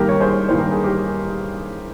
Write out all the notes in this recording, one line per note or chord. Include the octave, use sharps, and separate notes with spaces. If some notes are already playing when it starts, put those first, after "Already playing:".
Already playing: G2 D#3 G3 A#3 G4 A#4
C#5
G#4 C5
G2 D#3 G3 A#3 C5
A#4
G#4
G4 A#4